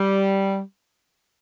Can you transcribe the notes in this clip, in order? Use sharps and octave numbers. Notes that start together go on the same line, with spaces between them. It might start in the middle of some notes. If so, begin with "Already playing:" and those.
Already playing: G3